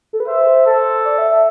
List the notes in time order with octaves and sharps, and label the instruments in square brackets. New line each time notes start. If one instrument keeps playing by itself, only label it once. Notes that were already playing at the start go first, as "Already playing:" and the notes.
[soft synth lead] A4
B4
[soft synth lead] C5 [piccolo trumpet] E5
[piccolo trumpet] A4
[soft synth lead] D5
E5
E5